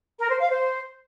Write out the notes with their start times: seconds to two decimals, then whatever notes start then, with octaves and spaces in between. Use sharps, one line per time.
0.19 A#4
0.29 C5
0.39 F5
0.50 C5